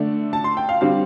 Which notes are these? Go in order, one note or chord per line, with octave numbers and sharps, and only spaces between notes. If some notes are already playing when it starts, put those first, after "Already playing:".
Already playing: D3 A3 D4
A5
C6
G5
F5
D3 G3 C4 F5